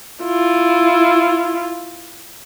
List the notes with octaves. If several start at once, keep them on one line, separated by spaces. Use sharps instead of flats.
E4 F4